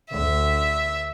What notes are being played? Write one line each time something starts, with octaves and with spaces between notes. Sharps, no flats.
D2 D3 E5